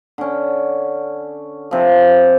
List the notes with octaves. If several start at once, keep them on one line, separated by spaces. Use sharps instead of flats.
D3 C#4
C3 F3